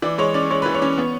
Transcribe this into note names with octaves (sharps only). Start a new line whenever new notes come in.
E3 D5
G#3 C#5
C#4 D5
G#3 C#5
E3 B4
C#5
C#4
B3